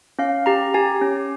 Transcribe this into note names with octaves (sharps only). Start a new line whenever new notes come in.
C#4 F5
G4 A#5
G4 G#5
C#4